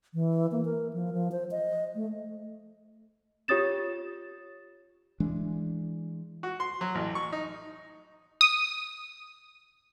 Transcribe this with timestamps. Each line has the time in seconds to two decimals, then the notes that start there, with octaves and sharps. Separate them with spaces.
0.14 E3
0.52 A#3
0.65 A#4
0.93 F3
1.13 F3
1.32 C5
1.51 D#5
1.95 A3
3.48 F4 G4 C#5 D#6 A6 E7
5.20 E3 G#3 D4
6.43 F#4
6.60 C6
6.81 F#3
6.95 A1
7.15 C#6
7.32 D#4
8.41 D#6